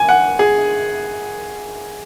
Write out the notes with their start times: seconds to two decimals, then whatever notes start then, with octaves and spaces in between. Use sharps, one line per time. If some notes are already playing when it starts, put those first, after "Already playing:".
Already playing: G#5
0.09 F#5
0.39 G#4